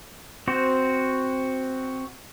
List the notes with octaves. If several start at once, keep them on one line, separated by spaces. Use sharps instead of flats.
C4 F#4 C5